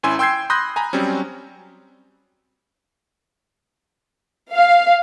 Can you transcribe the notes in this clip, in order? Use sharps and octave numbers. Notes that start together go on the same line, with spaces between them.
G#1 C#4 E4 G#5 C6 E6
G5 C6 E6 G6 G#6 C7
B5 C6 D#6 F#6 G6 A#6
G#5 A#5 B5
F#3 G3 C4 C#4
F5